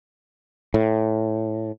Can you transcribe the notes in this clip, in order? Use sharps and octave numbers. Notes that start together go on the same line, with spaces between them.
A2